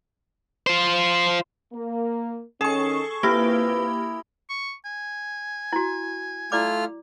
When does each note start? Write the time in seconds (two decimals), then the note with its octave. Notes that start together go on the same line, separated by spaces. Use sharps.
0.67 F4 C5
1.73 A#3
2.61 D#3 C#4 G#4 A4 C#6
3.23 C3 A#3 E4 F4 G4 B4
4.49 C#6
4.85 G#5
5.73 E4 F#4
6.52 A3 E4 F4 D5 D6 F6